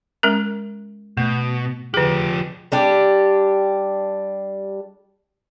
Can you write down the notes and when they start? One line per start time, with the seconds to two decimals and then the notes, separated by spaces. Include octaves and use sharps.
0.23 G#3 C#4 A#4
1.17 B2 A3
1.94 D3 F3 G4 G#4
2.72 G3 D4 G4